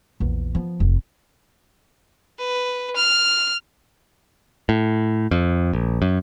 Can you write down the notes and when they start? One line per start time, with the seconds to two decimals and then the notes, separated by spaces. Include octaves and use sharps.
0.20 A#1 E2
0.55 F3 B3
0.80 F1
2.39 B4
2.96 F6
4.69 A2
5.31 F2
5.73 A#1
6.02 F#2